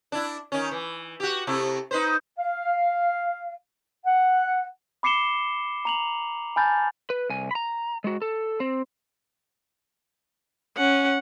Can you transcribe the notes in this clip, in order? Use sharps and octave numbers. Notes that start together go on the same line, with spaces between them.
D4 E4
D#3 C#4
E3
F#4 G4
C3 A3 E4
D#4 B4 C5
F5
F#5
B5 D6 C7 C#7 E7 G7
A#5 F7 F#7
G#5 A5 B5 F6 G6 A6
B4
C2 G#5
A#5 B5
G#3 F#4
A4
C4
C#4 F#5